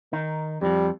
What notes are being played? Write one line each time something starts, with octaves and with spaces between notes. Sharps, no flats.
D#3 D#4
F2 F3 G3